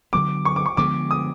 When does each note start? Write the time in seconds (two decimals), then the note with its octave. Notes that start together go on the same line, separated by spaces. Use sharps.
0.13 D3 F#3 B3 D6
0.45 C#6
0.56 D6
0.66 C#6
0.77 D3 F3 G#3 B3 D6
1.11 D#6